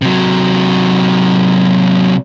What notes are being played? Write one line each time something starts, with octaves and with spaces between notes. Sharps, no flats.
C3 F#3